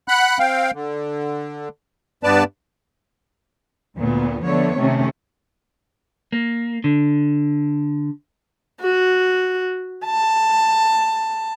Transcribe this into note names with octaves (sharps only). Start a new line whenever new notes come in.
F#5 B5 F#6
C4 F5 G5
D3
G2 B3 B4 D5 A5
D2 A#2 B3
D3 F3 A3 B3 C#5
C3 D#3 A3 C#4
A#3
D3
F#4
A5